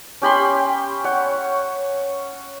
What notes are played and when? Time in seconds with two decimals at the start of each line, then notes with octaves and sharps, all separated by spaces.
0.22 C#4 G4 B5 C6
1.04 C#5 F#5